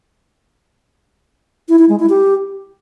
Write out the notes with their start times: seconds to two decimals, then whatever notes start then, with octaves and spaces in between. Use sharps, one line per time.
1.69 E4
1.79 E4
1.89 G#3
1.99 E4
2.10 G4